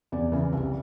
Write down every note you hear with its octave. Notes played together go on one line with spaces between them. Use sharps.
E2 D5
C#3 E3
C2